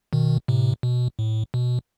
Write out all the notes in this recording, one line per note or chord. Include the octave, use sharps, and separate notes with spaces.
B2 D#3
A2 C3
B2
A2
B2